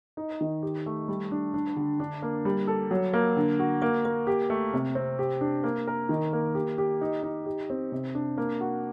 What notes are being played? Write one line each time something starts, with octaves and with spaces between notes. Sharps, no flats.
D#4
D#3
G4
A3
G3
D4
D4
D3
D4
A#3
G3
A4
F#3
A#3
D3
F#4
A#3
A#3
G4
A3
C3
C4
G4
D4
A#3
A#4
D#3
A#3
G4
G4
D#4
D#4
G4
C4
C3
D4
A#3
F#4